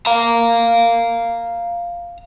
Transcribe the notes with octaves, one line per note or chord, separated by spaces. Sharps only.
F5 A#5